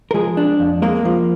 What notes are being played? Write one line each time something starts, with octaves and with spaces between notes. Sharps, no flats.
A#4
F3 G#3 G#4
D4
F2
G#3 A#3 A#4
F3